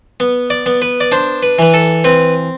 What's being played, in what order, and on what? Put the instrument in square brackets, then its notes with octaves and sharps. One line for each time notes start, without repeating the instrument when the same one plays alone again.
[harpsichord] B3
D5
B3
B4
D5
D4 C5
B4
E3 B4
A4
C4 B4